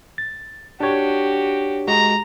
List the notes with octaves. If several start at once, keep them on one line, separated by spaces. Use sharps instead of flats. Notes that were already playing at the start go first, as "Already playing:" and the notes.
A6
D4 F#4 G4 C#5
G#3 F#4 A#5